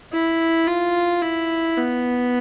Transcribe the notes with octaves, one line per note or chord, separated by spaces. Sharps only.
E4
F4
E4
B3